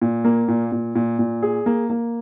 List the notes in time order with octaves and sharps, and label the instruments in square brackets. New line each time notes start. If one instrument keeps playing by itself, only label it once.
[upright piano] A#2
A#3
A#2
A#2
A#2
A#2
G#4
A#3
A#3